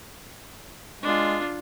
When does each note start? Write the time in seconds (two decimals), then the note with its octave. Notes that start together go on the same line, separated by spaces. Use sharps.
1.03 G#3 D4 F4